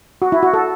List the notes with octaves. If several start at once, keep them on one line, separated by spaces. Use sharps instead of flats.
F#4
E4
F#4
A4